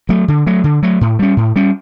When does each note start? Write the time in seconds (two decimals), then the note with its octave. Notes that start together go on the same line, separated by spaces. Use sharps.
0.09 F#3 A3
0.28 D3
0.47 F#3 A3
0.64 D3
0.83 F#3 A3
1.01 A2
1.19 G3 C#4
1.37 A2
1.56 G3 C#4